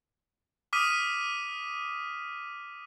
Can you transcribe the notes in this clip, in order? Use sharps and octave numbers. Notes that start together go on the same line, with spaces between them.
D6 D#6 F6 B6 D#7